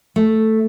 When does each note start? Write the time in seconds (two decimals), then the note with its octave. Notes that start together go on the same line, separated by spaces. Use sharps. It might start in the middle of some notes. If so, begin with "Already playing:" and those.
0.16 A3